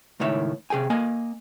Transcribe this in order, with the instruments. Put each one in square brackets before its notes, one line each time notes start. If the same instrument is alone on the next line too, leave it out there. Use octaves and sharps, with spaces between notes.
[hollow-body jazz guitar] C#2 A2 D#3 C#5 E5
C3 G#4 G5 G#5
A#3 D#5 G#5